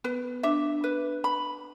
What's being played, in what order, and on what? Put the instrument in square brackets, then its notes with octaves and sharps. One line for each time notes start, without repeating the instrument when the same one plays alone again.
[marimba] B3 [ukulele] B4
[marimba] D4 [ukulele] E5
[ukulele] B4
B5